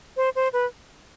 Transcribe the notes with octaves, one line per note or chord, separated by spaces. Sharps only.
C5
C5
B4